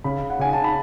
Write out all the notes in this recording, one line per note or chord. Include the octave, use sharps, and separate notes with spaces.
C#3 B5
F#5
C#3 G#5
A5
B5